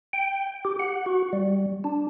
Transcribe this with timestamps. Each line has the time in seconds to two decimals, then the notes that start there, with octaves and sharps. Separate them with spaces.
0.13 G5
0.65 G4
0.79 F#5
1.06 F#4
1.33 G3
1.84 D4